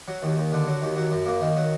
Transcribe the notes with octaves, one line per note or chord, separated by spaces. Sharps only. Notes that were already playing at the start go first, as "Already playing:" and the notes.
F#3
D#2
D#2
D3
F#3
D#2
F#3
F#2
A#3
D#3
F#3